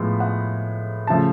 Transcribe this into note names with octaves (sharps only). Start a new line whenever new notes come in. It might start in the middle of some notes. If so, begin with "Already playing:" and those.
Already playing: A2 F3 G#3 B3
F#5
C#3 F3 A3 A5